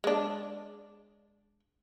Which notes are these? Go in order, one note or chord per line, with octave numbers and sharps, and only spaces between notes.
G#3 D4